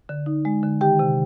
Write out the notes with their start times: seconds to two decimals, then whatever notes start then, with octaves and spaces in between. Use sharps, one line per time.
0.09 D3
0.26 D#4
0.45 G#3
0.63 D3
0.81 D#3 G4 G5
0.99 C3